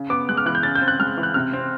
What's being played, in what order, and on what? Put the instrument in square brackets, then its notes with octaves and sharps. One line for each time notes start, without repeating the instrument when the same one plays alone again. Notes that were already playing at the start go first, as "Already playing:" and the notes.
Already playing: [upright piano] C#3
B3 D6
G#3 F#6
F6
E3 F#6
G6
C#3 A6
G6
C4
F#6
G#3 F6
E3
F#6
C3 F6
C4